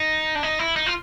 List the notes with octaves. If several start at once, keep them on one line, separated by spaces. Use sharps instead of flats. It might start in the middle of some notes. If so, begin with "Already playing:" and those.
Already playing: D#4
D4
D#4
E4
D#4
F4